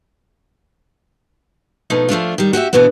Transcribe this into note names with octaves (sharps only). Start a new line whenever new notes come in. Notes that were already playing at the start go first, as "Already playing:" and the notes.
B2 F3 A3 D#4
F3 A3 D4 F4
D#3 G3
F#4 G4 D5 E5
D2 B2 E3 B3 D4